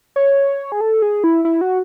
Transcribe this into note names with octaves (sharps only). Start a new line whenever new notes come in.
C#5
G#4
A4
G#4
E4
E4
F#4